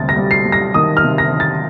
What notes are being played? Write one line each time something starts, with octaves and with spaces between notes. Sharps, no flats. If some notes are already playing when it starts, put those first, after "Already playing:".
Already playing: D2 C3 G3 A6
A#6
G3
C7
G3
A#6
D#3 D#6
F6
C3
A#6
D#3
A6